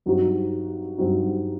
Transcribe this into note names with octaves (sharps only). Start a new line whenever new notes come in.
G2 F#3 C4 D#4 F#4
G2 F#3 C4 D#4 F#4